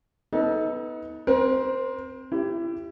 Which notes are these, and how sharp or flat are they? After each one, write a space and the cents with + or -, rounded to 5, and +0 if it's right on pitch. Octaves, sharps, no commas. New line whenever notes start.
B3 +0 D#4 +30 A4 +0
C4 +0 A#4 +40
E4 +30 G4 +0